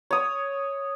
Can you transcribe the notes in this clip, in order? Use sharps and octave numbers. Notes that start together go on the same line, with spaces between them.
C#5 D#6